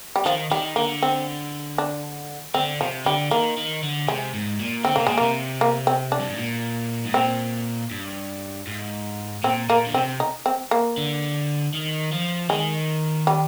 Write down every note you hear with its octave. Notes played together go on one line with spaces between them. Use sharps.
G3
D#3 F3
D#3 G3
D3 A#3
C4
D4
D3 C4
C3 F3
D3 G3
D#3 A#3
D#3
D3
C3 G#3
G#2
A#2
D3 C4
C3 A#3
A#2 G#3
C3 A#3
A#3
C4
D4
G2
G#2
A#2
G#2
A#2 C4
G2
G#2
A#2 C4
A#2 A#3
D3
C3 C4
D#4
C4
A#3
D3
D#3
F3
D#3 G#3
G3